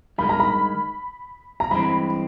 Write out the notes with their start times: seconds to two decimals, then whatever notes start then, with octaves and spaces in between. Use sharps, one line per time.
0.18 G2 D#3 G#3 B5
0.29 A#5
0.40 B5
1.60 A#5
1.71 G2 E3 G#3 C4 B5